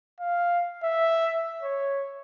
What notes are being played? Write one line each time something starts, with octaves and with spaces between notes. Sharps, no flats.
F5
E5
C#5